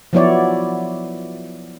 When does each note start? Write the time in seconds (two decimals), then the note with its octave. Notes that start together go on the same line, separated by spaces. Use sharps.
0.13 F3 F#3 B3 E4 C#5 D5